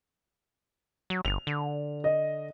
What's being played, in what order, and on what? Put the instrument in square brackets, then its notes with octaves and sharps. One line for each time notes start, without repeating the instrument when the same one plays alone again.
[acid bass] F#3
[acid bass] G1 [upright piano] F7
[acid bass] D3
[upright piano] D#5